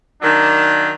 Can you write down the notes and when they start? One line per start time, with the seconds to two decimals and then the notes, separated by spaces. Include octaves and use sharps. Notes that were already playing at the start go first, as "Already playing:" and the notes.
0.22 D#3 F#3 A#3 D4